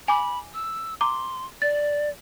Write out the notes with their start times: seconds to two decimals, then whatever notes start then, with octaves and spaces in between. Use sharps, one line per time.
0.08 G#5 B5 D6
0.54 E6
1.01 A#5 C6 D6
1.62 D5 A6